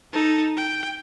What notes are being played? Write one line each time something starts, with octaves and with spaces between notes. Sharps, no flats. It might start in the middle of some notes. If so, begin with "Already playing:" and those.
D#4 A4
G5